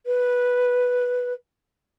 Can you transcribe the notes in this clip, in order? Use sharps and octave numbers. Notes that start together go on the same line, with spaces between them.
B4